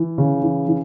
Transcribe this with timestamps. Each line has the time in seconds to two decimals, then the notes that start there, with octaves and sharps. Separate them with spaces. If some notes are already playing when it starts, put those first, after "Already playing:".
Already playing: E3
0.18 C#3
0.42 E3
0.68 E3